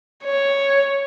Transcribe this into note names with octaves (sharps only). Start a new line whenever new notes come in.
C#5